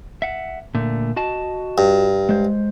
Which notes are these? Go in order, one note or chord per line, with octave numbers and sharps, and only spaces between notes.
E5 F#5
A#2 D3 A3
F#4 D#5 A5
G2
G#3 C5